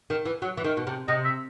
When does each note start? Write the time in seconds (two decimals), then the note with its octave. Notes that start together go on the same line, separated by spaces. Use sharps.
0.10 D#3
0.25 E3
0.42 F#3
0.57 E3
0.64 D#3
0.77 B2
0.87 C3
1.08 C3 D#5
1.25 E5